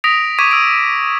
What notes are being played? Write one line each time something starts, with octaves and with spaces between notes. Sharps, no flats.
D#6 A#6 B6 D7 F7
C#6 D6 G#6 B6 D#7
E6 D7